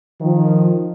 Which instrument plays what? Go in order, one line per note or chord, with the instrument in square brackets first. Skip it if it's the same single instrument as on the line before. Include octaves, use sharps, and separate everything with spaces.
[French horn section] D#3 F3